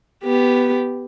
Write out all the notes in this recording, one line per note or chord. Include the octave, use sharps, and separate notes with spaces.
B3 G4